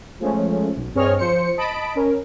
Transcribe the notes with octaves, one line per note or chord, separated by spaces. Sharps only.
F3 G#3 A3 C#4
B1
G2 C4 G#4 C#5 D#5 F6
F3 C5 C#7
D#5 A5 B5 D7
C#4 A#4